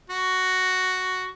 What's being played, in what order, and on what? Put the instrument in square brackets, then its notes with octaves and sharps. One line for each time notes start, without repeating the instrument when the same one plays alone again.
[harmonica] F#4